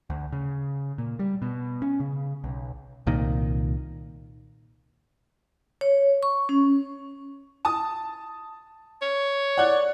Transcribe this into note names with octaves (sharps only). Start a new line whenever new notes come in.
D2
C#3
A#2
G3
B2
C#4
C#3
B1
C2 A#2 D#3
C#5
C#6
C#4
A5 D#6
C#5
D5 F#5 F#6